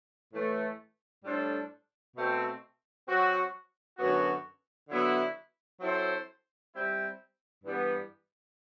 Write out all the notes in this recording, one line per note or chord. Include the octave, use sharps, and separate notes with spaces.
A2 E3 A3
A2 G3 D4 A4 C5
B2 A3 C4
F#3 C4 F#4
F#2 D3 F#3 B3 F#4
D3 F#3 B3 E4
F#3 C4 E4 A4 C5
G3 C4 E4
G2 E3 G3 B3